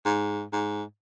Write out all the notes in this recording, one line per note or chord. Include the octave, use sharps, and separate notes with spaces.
G#2
G#2